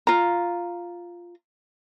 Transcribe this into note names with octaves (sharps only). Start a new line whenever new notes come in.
F4 A#5